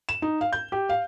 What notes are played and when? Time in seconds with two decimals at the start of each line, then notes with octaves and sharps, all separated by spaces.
0.09 E7
0.22 D#4
0.41 F5
0.53 G6
0.72 G4
0.89 F5